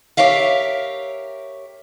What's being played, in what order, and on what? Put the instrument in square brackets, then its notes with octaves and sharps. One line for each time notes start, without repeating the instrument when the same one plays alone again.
[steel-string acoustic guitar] G4 A4 A#4 C#5 E5 F5